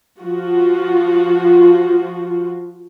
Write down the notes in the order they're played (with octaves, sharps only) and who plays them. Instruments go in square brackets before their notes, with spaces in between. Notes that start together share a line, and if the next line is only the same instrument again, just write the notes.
[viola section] F3 F4 F#4